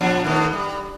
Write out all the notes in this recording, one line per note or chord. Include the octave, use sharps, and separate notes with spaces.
A#2 F3 D4
D#3 A3 B3
G3